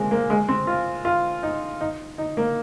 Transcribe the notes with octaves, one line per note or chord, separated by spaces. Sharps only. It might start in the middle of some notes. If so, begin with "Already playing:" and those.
Already playing: G#3 A#3 C4
A#3
G#3
C4
F4
F4
D#4
D#4
D#4
A#3